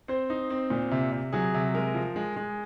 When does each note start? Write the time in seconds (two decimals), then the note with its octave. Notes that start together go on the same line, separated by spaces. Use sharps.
0.08 C4 C5
0.30 D#4
0.50 C4
0.70 A#2
0.91 C3
1.12 C3
1.32 F#3 G#4
1.54 C3
1.74 G#3 A#4
1.95 F3
2.16 G#3
2.36 G#3